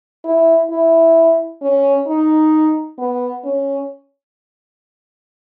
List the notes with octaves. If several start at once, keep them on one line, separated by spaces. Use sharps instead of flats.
E4
E4
C#4
D#4
B3
C#4